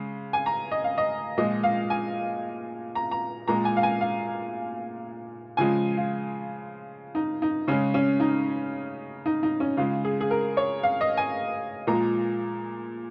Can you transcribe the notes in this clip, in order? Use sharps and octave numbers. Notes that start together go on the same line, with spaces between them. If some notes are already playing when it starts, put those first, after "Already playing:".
Already playing: C#3 G#3
G#5
A#5
D#5
F5
D#5
A#2 F3 G#3 D#5
F5
G#5
A#5
A#5
A#2 G#3 A#5
G#5
F5
G#5
F5
C#3 F3 G#3 G#5
F4
D#4
D#4
C#3 G#3 C#4
C#4
D#4
D#4
D#4
C#4
C#3 G#3 F4
G#4
G#4
A#4
C#5
F5
D#5
G#5
A#2 F3 G#3 A#5